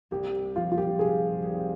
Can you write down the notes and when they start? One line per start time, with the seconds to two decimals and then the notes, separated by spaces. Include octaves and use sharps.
0.11 C2 G4
0.55 F3 F4
0.72 F4
0.78 G4
0.99 C3 G#4
1.42 C2